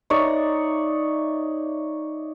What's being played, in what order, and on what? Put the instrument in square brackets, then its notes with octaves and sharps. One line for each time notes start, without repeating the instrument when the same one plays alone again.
[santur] D#4 C#5 D5 E5